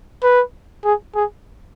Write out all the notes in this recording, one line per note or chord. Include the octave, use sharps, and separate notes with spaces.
B4
G#4
G#4